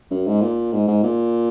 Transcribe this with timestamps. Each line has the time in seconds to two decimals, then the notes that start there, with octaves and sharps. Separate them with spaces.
0.11 F#2
0.27 G#2
0.42 A#2
0.73 G#2
0.88 G#2
1.03 A#2